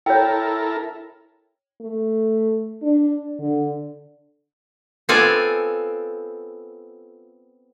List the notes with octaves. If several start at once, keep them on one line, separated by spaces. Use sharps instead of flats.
E4 A4 A#4 C#5 G5
A3
D4
D3
B3 C4 F4 A4 D5 G#5